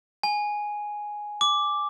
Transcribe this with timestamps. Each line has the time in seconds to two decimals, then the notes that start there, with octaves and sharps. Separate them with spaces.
0.23 G#5
1.41 D6